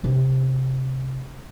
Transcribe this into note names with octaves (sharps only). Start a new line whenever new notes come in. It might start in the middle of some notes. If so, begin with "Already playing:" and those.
C3 D4